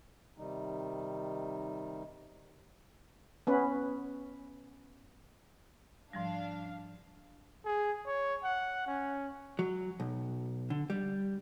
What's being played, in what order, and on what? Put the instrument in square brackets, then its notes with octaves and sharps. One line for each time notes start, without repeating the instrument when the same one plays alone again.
[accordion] C3 D#3 G3 D#4
[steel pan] B3 C#4 B4
[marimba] G#2 F3 G3 [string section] D4 F5
[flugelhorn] G#4
C#5
F#5
C#4
[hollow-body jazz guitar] F#3
B1
D3
G3